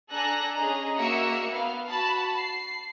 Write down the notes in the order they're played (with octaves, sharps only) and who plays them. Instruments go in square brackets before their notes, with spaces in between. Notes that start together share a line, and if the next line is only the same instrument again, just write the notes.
[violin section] D4 A4 G#5 A#5 F#6 A#6
C#4 G#4 D#5 A#5
A#3 F#4 A#4 E5 C#7
B3 F5
F#4 A5 B5
C7